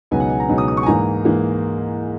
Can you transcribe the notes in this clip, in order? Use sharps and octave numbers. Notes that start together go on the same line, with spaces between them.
C#2 B2 F#3 B3 D#4 G#5
F#5
G#5
A#5
C#2 B2 F#3 B3 D#4
D#6
D#6
C#6
G#5
G#2 E3 A#3 A#5
G#2 E3 A#3